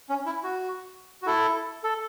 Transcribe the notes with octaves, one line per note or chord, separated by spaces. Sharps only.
C#4
E4
F#4
F#4
E4 A4
A4